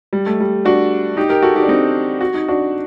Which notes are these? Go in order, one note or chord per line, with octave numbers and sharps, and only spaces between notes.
G3
A3
G3
D4 F#4
D#4 G4
G4 A#4
F#4 A4
D#4 G4
D4
C4 D#4
F#4
D#4
D4 F#4